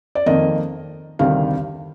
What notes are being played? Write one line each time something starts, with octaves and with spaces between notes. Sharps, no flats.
D5
F2 D#3 A#3 D#5
D2 C3 D#3 G3 F5